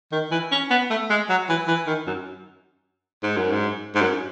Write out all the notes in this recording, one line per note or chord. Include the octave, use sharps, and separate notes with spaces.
D#3
E3
C#4
B3
A3
G#3
F#3
E3
E3
D#3
F#2
G#2
F#2
G#2
G#2
F#2